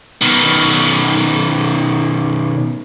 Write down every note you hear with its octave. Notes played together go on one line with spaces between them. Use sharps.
B2 D#3